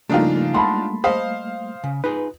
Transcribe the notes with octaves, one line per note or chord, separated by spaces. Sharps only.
C#3 F3 G3 A3 A#3 D4 D#4 F4
G#3 F#5 A5 B5 C6
C5 D#5 F5 A5 B5 D#6
C#3
D#4 F4 G#4 B4